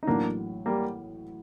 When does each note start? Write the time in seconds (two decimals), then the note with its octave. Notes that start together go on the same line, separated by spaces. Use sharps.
0.03 D#4
0.07 A1 A2 F#3 A#3 D4
0.66 G3 A#3